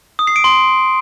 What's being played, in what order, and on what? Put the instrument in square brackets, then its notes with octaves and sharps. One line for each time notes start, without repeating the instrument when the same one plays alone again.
[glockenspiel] D#6
C7
D7
C6